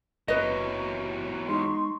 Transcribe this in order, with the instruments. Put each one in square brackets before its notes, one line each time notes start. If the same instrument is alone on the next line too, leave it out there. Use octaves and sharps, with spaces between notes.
[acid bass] F#1 [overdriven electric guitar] E2 F#3 [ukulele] B4 D#5
[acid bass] G#3 [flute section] D#4 C6 C#6